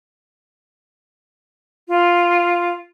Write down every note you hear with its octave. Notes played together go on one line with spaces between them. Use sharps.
F4